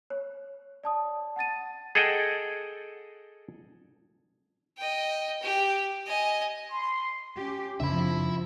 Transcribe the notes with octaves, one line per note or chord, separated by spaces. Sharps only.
C#5
D5 A5 D#6
F#5 A5 A6 D#7
G#4 A4 D#5 F#5 G5
D#5 G5
G4
D#5 G#5
C6
C#4 G4
F#2 C#3 F3 C4 D4 E5 B5